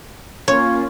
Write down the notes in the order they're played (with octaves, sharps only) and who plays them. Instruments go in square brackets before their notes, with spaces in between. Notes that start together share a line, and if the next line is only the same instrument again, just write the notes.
[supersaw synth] A#3 C#4 F4 [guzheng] C#5